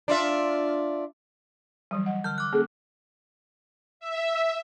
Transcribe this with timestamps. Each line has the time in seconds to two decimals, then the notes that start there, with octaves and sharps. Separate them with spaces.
0.08 D4 F4 E5
1.91 E3 F#3 G3
2.06 D#5 F#5
2.24 D3 F6 G6
2.38 D6 F#6
2.53 A#3 C#4 G#4 A4
4.00 E5